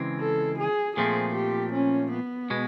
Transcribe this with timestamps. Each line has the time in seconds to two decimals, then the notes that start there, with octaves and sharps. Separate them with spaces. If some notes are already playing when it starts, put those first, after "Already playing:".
Already playing: C#3 E3 G#3 C4
0.21 A4
0.59 G#4
0.97 A#2 F3 A3 C4 G#4
1.35 G4
1.73 C#4
2.12 B3
2.50 B2 G#3